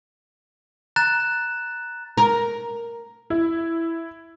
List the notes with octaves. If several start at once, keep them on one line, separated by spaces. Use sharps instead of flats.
A#5 F#6 A6 E7
A#4
E4